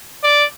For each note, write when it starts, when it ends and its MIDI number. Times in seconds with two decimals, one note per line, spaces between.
0.24 0.45 74